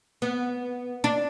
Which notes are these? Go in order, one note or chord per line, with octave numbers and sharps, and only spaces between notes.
B3
D4